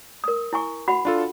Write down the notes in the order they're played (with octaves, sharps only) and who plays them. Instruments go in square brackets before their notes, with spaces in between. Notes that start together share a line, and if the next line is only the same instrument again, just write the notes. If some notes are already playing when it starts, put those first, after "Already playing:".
[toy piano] A#4 D#6
E4 G#5 C#6
F#4 F#5 B5
[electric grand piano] D4 F4 A4